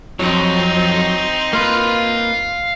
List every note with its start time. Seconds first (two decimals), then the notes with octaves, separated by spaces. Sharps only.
0.19 F2 F#3 C4 D#4
1.53 A#3 B4 F5 C6